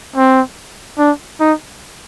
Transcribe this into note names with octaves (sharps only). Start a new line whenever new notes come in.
C4
D4
D#4